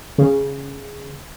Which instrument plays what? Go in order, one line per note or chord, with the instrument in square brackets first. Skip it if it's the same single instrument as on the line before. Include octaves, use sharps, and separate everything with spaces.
[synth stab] C#3